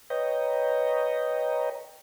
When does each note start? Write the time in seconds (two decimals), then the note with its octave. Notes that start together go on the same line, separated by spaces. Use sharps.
0.10 B4 C#5 D#5 G5 A#5